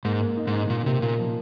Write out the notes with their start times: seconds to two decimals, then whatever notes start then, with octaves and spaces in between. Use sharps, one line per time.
0.04 G#2 A#3
0.21 A#3
0.37 D#4
0.47 G#2
0.54 D#4
0.70 A#2 D#4
0.86 C3 A#3
1.02 A#2 A#3
1.19 F3